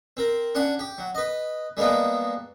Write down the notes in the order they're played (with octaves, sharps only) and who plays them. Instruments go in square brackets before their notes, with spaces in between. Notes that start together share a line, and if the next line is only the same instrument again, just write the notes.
[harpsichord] C4 A#4
C#4 D4 F#5 G#5
G4
F#3
B4 D#5
G3 G#3 A#3 B3 D4